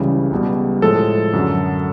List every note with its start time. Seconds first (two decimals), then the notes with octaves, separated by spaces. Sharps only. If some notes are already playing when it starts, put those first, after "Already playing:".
Already playing: C#2 C#3 E3 G3
0.31 C#2 B2 G3
0.82 A2 F3 G#3 A4
1.33 F#2 D3 F#3